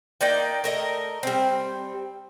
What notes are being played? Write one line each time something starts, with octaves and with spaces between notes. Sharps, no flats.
A#3 D#4 D5 G5
A3 A#4 D#5
G3 C4